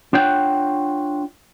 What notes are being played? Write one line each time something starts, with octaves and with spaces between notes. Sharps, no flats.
D4 F4 C#5 F#5 G5